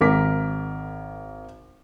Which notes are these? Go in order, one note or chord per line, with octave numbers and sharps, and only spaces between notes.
G#1 A#4 D6 B6